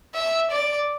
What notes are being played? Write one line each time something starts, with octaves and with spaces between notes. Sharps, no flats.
E5
D5